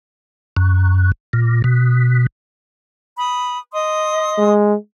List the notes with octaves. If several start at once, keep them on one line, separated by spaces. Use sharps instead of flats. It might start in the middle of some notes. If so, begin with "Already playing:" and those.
F#2
A#2
B2
B5 D#6
D#5 C6 D#6
G#3